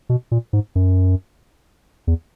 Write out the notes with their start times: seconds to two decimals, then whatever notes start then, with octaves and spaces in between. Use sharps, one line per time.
0.09 B2
0.31 A#2
0.53 G#2
0.75 F#2
2.07 E2